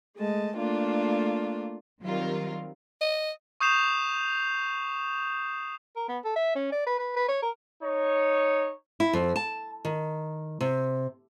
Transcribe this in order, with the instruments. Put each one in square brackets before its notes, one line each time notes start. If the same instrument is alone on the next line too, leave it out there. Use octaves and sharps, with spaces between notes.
[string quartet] G#3 A3 D#5 A5
A3 A#3 D4 F4
[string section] D#3 F#3 G3 C4 F4 A#4
[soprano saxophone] D#5
[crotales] C#6 D#6 G6 C7 E7 F7
[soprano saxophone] A#4
B3
A4
E5
C#4
D5
B4
B4
B4
C#5
A#4
[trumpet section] D#4 C#5
[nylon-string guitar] E4
F2
A5
D#3
C3